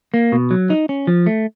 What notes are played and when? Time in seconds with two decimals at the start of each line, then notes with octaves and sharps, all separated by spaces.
0.14 A#3
0.32 B2
0.51 F#3
0.70 D#4
0.89 C#4
1.07 F3
1.26 A3